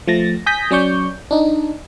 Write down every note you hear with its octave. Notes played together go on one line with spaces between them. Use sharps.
F3 A3 A6 A#6
G#5 D#6 G6 A#6 B6
F#3 C#4 D5 C#6 G6
D4 D#4